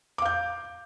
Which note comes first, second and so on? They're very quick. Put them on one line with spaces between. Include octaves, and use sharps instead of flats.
D6 F5 G6